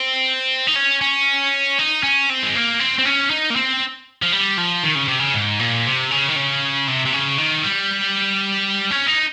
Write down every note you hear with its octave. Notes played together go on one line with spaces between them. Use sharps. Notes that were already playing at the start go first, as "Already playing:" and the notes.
Already playing: C4
D#4
C#4
C#4
D#4
C#4
C4
G#3
A#3
C4
C4
C#4
D#4
A#3
C4
F3
G3
F3
D#3
C#3
C3
C#3
G#2
A#2
C3
C#3
D#3
C#3
C3
C3
C#3
D#3
G3
C#4
D#4